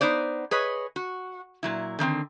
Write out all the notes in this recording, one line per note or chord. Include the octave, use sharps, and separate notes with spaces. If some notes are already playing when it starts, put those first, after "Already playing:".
B3 D#4 C5 D5
G#4 B4 C#5 D#5
F#4
A#2 F#3 E4
D3 D#3 A#3 C4